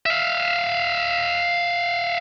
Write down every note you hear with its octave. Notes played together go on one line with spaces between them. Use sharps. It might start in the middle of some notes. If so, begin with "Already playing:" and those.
E5 F5